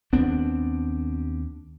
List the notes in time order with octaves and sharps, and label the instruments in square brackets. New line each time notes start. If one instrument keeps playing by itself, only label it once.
[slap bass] D#2 B3 C4 D4